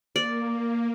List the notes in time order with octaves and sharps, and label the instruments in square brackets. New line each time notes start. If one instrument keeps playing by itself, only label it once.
[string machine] A#3 [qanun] D5